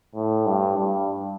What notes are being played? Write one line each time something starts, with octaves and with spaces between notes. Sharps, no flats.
A2
G2
G2